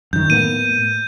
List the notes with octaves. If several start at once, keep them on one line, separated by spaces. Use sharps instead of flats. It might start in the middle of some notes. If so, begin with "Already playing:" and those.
F#2 D#3 G6
A2 A#3 B3 D#7